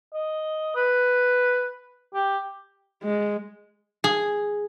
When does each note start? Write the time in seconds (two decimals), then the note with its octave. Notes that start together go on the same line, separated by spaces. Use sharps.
0.14 D#5
0.76 B4
2.15 G4
3.04 G#3
4.04 G#4